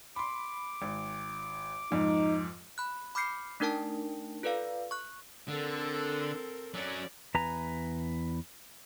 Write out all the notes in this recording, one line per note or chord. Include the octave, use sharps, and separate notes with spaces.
B5 C6 D6
G#1
F2 G#2 D#4
B5 F#6
B5 D6 F6 G6 C7 C#7
A3 D4 D#4 A#4 G5 A5
F4 A4 B4 D5 F5
C#6 F#6
D3 C4 A4 A#4
F#3 C#4 D5
E2 B4 G#5 A#5